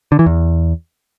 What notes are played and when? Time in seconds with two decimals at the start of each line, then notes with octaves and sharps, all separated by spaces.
0.12 D3
0.19 E3
0.26 E2